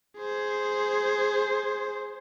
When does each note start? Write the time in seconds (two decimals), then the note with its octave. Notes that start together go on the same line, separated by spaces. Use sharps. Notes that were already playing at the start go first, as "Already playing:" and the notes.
0.17 G#4 C5